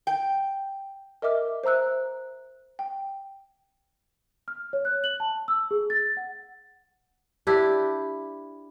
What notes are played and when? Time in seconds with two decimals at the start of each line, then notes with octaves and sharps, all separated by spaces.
0.07 G5
1.22 A#4 D#5 E5 D6 F6
1.64 C5 E5 A#5 E6 F#6
2.79 G5
4.48 F6
4.73 C#5
4.85 F#6
5.04 F#7
5.20 A5
5.48 E6
5.71 G#4
5.90 A6
6.17 F#5
7.47 D4 E4 G4